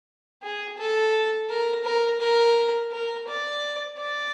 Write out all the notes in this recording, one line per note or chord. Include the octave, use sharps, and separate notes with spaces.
G#4
A4
A#4
A#4
A#4
A#4
D5
D5